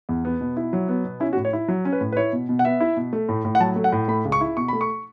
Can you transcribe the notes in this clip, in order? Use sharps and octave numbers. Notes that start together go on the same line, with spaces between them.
E2
B3
B2
E4
F#3
B3
B2
C#4 E4
F#4
A2
C#5
E4
F#3
C#4
B4
A2
B4
E4 C#5
B2
B2
F#5
B3 E5
E4
B2
A3
A2
A2
F#5
F#3 A5
A3
F#5
A2
A3 B5
C#2
C#6
E4
B2 C#6
A3 B5
C#6